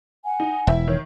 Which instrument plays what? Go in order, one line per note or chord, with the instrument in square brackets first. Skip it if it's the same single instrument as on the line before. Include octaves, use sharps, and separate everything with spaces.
[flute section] F#5 G#5
[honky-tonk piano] D#4
[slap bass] E1 [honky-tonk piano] E4 E5
[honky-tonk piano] D#3 [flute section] C#5